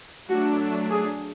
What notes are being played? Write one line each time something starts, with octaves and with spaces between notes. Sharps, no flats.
F#3 A3 D4 F#4
G#4